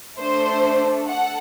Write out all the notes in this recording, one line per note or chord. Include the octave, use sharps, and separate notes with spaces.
A3 D4 A4 C5
A4 F#5